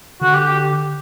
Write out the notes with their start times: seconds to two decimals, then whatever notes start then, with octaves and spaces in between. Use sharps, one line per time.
0.21 D3 F#4
0.34 G4
0.46 G4